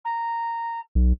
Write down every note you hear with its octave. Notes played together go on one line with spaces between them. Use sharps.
A#5
B1